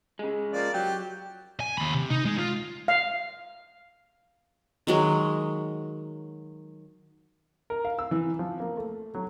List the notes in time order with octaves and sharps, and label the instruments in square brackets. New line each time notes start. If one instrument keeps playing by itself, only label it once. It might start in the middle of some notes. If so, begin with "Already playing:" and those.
[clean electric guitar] C#3 G#3
[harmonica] F3 A#3 D5
[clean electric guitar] F#3 [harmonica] G4
[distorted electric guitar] G#5
D#2 B5
C3
D#4
G#3
F4
[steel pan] F5
[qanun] D#3 F#3 G#3 A#4
[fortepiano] A#4
F5
E6
E3
F3
A#3
A3
F#3